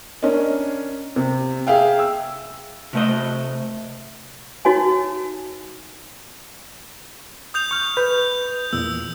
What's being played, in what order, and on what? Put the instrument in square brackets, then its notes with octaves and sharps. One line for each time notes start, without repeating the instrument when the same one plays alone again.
[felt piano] C#4 D4 A#4 D#5
C3
G#4 E5 F5 G5
E6
[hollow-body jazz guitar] C3 A3 D#5
[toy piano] D#4 F#4 C#5 G#5
[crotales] D#6 G6 F7
[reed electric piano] C#6 F6
[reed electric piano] B4 [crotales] G6
[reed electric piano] E2 A#2 [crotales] E6